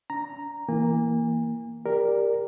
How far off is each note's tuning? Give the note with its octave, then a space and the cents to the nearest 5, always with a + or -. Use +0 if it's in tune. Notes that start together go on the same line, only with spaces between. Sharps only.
D4 -40 A#5 +0
E3 +0 A#3 +0 G#5 -35
G4 +25 A#4 +0 D5 +0